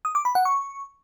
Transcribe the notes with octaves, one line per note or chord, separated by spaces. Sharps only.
D#6
D6
B5
F#5
C#6